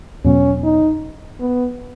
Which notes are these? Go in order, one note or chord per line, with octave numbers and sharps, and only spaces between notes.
E2 B2 F#3 B3 C#4
D#4
B3